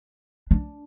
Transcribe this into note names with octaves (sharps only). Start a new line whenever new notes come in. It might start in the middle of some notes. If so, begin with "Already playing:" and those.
D4